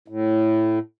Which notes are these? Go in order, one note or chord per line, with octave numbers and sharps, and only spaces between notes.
A2